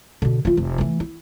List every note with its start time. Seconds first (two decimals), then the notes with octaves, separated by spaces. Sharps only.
0.22 B2 D3
0.45 E3 F4
0.57 F1
0.78 E3 A3
1.00 E4